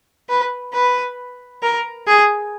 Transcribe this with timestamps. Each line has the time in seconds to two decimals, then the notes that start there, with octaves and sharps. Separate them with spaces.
0.29 B4
0.73 B4
1.62 A#4
2.07 G#4